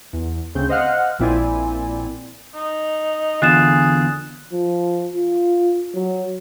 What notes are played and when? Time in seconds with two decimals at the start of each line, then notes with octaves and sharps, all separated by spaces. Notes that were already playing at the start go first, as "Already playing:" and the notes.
0.13 E2
0.55 D2 C#3 C4 G6
0.69 C5 D#5 F5 F#5 F6 F#6
1.19 A#1 A#2 C4 E4 D5 G#5
2.54 D#4
3.42 E2 D3 F4 G#4 F#6 A6 E7
4.53 F3
5.14 F4
5.95 F#3